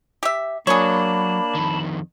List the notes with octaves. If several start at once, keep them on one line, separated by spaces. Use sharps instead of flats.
G4 E5
F#3 A#3 D4 G#4 C#5 A5 B5
F2 D#3